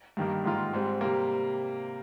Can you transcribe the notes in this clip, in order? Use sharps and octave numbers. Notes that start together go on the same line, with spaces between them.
G2 D#3 G3 A#3
G#2 D#3 A#3 F4
G#2 G3 C4
C3 G3 A#3